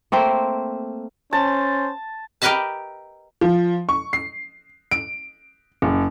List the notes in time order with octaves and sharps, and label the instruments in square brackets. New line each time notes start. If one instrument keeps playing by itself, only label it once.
[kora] A3 A#3 C4 C5
[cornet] C#4 [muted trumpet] C5 [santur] A5
[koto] G4 A#4 B4 D#5 E5 A5
[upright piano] F3
C#6
C7
D7
F#1